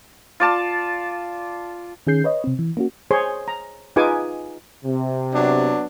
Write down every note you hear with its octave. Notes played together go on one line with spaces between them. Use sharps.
F4 D5 A5
D#3 C#4 G#4 G6 C7
B4 C#5 D#5
C3 C4
E3
A#3 C#4 F#4
G#4 C5 C#5 C6
A#5
D#4 F4 G#4 B4 G#5 D6
C3
F#3 B3 D4